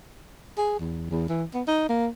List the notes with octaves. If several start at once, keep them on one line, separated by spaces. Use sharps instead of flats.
G#4
E2
E2
E3
B3
D#4
A#3